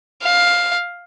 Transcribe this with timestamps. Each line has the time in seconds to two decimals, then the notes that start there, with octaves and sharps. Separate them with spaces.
0.22 F5